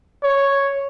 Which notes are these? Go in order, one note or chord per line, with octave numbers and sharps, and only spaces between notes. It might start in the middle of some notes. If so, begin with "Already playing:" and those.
C#5